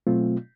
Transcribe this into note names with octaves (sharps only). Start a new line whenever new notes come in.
B2 F#3 A3 C4 F4